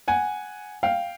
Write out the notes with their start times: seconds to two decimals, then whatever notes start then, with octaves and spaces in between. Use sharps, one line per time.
0.08 F#5 G#5
0.83 F5 G5